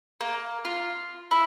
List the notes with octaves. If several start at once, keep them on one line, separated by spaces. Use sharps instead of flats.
A#3
F4
E4